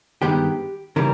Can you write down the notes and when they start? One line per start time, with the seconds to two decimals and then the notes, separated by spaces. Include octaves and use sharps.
0.22 G2 D#3 G#3 B3 G4
0.96 C#3 E3 G3 A#4